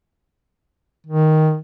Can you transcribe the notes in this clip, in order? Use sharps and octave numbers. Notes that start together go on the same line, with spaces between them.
D#3